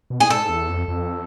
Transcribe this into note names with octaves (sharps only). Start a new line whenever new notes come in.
B2
A2 G#4
G#2 A4
E2
F2
F2